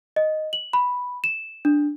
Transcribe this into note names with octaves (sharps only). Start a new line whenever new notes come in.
D#5
F#7
B5
E7
D4